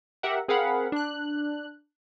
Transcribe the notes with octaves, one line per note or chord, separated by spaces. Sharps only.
G4 A#4 E5 F#5
C4 G#4 A#4 F5 F#5 B5
D4 F#6